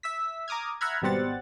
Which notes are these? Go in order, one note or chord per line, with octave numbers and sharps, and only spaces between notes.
E5 E6 B6
A#5 D6 D#6 F6 G#6
E5 F#5 A#5 B5 F6 G#6
G#1 B2 G3 C4 F#5 A6